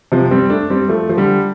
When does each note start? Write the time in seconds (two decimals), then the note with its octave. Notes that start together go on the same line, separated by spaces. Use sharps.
0.12 C3 F3
0.31 G3 C4
0.50 A3 D4
0.70 G3 C4
0.89 F3 A3
1.09 F3
1.17 D3 G3